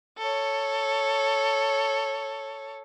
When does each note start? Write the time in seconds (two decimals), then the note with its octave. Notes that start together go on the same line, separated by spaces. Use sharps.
0.18 A4 C#5